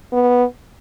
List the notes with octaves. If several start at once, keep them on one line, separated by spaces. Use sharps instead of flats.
B3